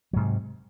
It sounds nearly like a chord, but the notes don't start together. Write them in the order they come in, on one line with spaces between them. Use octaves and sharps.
F#3 G#2 C3